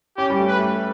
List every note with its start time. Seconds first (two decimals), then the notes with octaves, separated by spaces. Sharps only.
0.17 C#4 G4
0.30 G3
0.38 A3
0.48 B4
0.59 A3